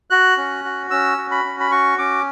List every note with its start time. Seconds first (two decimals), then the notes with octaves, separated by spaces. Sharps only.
0.10 F#4 F#6
0.37 C#4
0.64 F#4
0.91 C#4 E6
1.18 F#4
1.31 B5
1.45 C#4
1.60 B5
1.71 F#4 C#6
1.98 C#4 D6